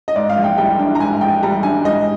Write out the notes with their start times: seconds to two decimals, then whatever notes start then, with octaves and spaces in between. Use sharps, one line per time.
0.08 D#5
0.16 G#2 D5
0.29 F5
0.37 A#1
0.44 G5
0.58 G3 G5
0.79 D4
0.95 A#5
1.00 G#2 G#5
1.21 A#1 G5
1.42 G3 A#5
1.63 D4 G#5
1.84 G#2 D#5